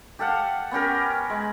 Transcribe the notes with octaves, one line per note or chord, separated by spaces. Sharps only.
G4 A4 F5 F#5
B3 C#4 G4 A#4
G#3